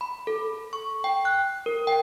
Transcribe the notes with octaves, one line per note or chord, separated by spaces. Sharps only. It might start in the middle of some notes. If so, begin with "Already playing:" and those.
B5
A4
C#6
G5
F#6
A#4
G5